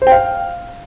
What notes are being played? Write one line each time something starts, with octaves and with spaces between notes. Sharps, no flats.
C5
G5
F5